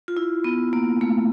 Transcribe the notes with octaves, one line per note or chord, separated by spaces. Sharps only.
F4
E4
B3
A#3
A3